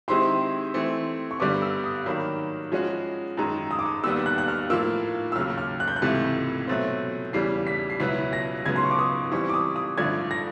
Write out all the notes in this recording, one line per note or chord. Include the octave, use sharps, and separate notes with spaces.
D#3 G#3 C4 E4 G4 C6
E3 A3 C4
C#6
G2 D3 G3 B3 D6
E6
D#6
D#3 F#3 A#3 B5
F3 G#3 C#4 F#4
F#2 D#3 G#3 A#5
D#6
D6
D#6
D#2 D#3 G3 B3 E6
F#6
F#6
F6
A2 F3 A#3 E6
E6
D#2 C#3 F#3 F6
F6
F#6
G6
F#6
C#2 C3 E3 A3
B2 F#3 A3 C4
E2 C#3 E3 G3 C7
B6
C7
C#2 B2 F#3 B3 E4 B6
A#6
C#2 C#3 F#3 B3 G#6
C6
C#6
D6
D#6
E3 G3 C4 C#6
D6
D#6
D#6
G2 D3 F3 A3 G#6
A#6